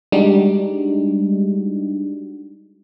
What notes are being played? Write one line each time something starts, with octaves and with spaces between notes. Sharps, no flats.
G3 G#3 D4 D#4 F#4